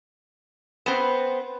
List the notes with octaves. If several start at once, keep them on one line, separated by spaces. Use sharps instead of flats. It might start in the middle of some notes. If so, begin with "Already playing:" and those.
B3 C4